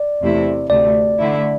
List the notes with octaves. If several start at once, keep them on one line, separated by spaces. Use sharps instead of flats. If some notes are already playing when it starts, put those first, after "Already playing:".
Already playing: D5
E2 C3 A3 E4
D2 C3 A3 D5
D3 A3 E4